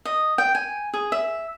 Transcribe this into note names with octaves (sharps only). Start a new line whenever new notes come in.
D#5
G5
G#5
G#4
E5